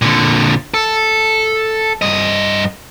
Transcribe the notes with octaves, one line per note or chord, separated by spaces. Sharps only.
A#2 D3
A4
G2 D#5